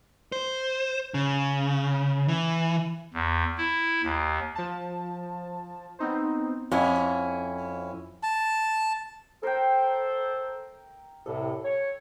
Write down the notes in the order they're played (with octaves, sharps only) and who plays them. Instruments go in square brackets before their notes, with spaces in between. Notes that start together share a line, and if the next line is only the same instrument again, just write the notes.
[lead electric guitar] C5
C#3
E3
[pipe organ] E2
E4
D#2
[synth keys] F3 A5
B3 C4 D#4 C5
[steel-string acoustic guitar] F2 C#4 E4
[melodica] A5
[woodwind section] A4 C5 [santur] A#4 E5 G5
[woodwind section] C2 A2 C3 [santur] A4
[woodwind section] C#5